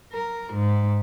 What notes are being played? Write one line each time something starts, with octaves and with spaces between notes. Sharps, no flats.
A#4
G#2